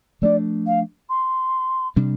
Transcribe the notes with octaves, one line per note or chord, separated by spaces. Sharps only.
F3 A3 D4 D5
F5
C6
C3 G3 D4